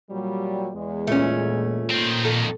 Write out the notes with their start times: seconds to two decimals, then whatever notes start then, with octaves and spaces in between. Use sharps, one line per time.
0.11 A#2 F#3 G3
0.75 E2 G#3
1.07 A#2 A3 C#4
1.91 D#3 C4
2.25 F2 D#3 A4